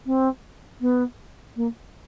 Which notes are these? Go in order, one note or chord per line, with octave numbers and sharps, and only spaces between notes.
C4
B3
A#3